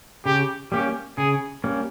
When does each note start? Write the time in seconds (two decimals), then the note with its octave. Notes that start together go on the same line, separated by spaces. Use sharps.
0.26 C#3 G4
0.72 G3 A#3 C#4 G4
1.17 C#3 G#4
1.64 G3 A#3 C#4